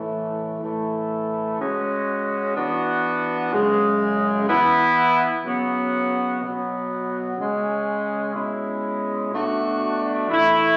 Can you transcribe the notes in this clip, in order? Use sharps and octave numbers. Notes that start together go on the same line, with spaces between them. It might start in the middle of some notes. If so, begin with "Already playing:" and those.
Already playing: A2 E3 A3
A2 E3 A3
C#3 G#3 C#4 F#4
E3 B3 D4 F#4
F#2 C#3 G#3
E3 B3 E4
C#3 F#3 B3 F#4
B2 F#3 B3 F#4
C#3 G#3 C#4
B2 G#3 C#4 E4
B2 A3 D4 F#4
E3 A3 E4